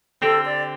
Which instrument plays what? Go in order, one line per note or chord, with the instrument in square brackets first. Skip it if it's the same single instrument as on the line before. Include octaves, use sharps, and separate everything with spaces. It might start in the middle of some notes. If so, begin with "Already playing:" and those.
[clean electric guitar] D3 C4 G4 [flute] A4
[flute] D5